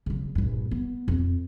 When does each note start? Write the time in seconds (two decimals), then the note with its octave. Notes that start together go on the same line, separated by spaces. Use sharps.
0.06 C#3 F#3
0.35 A#1 G2
0.71 B3
1.08 F2